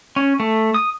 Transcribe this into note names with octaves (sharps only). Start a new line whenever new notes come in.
C#4
A3
D#6